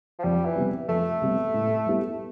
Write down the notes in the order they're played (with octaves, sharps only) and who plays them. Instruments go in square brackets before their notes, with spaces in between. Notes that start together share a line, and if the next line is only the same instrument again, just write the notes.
[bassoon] F3
[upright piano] F2 [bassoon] G3
[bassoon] E3
[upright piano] C3 G3 B3
[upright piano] F2 [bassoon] A3
[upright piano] C3 G3 B3
A2
G3 B3 E4 G4